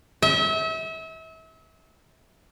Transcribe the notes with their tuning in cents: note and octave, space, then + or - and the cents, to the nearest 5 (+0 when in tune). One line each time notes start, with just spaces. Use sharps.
E5 -35